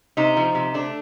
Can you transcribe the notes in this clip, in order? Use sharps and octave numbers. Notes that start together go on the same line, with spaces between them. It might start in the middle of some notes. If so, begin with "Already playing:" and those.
C3 D#4
F3
C3
A3 D4